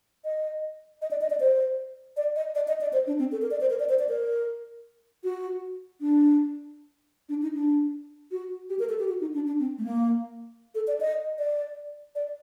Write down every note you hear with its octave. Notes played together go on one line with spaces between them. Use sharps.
D#5
D#5
D5
D#5
D5
C5
D5
D#5
D5
D#5
D5
C5
D4
C4
A4
A#4
D5
C5
A#4
D5
C5
D5
A#4
F#4
D4
D4
D#4
D4
F#4
G4
A#4
A4
G4
F#4
D#4
D4
D4
C4
A3
A#3
A4
D5
D#5
D5
D5